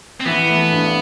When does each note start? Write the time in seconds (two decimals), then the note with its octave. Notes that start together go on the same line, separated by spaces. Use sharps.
0.21 C4
0.26 E3 B3
0.50 A3
0.72 G2